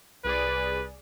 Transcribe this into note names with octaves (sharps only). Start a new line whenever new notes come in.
C2 G#4 B4 D5